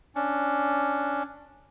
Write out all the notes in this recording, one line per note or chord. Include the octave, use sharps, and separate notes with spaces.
C#4 D4